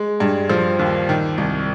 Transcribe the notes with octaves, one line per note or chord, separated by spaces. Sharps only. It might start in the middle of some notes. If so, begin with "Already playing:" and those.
Already playing: G#3
G2
F3
D#2
D#3
C2